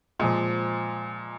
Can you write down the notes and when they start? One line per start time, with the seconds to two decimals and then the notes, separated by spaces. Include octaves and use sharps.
0.19 A#2 F3 G#3